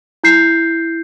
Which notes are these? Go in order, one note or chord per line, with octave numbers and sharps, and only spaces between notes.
E4 G6 C7